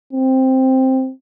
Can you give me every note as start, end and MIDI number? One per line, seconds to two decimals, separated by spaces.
0.13 1.11 60